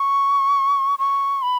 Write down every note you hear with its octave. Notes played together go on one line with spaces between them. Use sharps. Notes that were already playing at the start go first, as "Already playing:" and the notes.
Already playing: C#6
C#6
B5